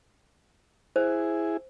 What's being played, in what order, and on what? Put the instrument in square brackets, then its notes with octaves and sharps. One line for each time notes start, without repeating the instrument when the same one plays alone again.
[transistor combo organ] E4 G#4 [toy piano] C5